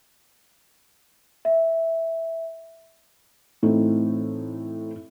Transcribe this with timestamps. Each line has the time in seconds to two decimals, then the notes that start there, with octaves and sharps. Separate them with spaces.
1.45 E5
3.63 A2 E3 A3 C4 D#4